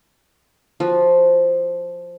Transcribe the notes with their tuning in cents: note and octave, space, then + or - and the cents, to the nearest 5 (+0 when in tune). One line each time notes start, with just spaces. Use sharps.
F3 +0 F#4 +0